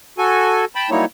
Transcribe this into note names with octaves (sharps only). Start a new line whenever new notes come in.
F#4 A4 G#5
G5 A5 B5
F#3 G3 A#3 D#4 E4 C#5